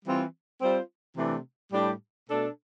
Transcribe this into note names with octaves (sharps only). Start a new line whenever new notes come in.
E3 G3 C4 F4
G3 C4 F4 C5
C3 E3 A3 D4
A2 G3 D4 G4
B2 A3 D4 A4